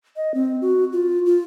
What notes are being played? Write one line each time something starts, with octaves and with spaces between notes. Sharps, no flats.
D#5
C4
F#4
F4
F4